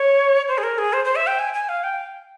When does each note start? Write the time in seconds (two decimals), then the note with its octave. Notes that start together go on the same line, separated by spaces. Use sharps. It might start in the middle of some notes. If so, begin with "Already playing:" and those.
Already playing: C#5
0.48 C5
0.58 G#4
0.63 A#4
0.78 G#4
0.93 C5
1.05 C5
1.16 E5
1.27 G5
1.39 G#5
1.54 G#5
1.69 F5
1.84 G5